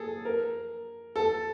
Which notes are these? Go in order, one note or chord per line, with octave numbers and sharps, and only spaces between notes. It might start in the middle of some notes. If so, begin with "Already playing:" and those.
Already playing: G#4 A4
A#4
A4